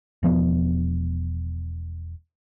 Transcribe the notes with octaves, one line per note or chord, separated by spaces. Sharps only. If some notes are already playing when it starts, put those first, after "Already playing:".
E1 F3 B3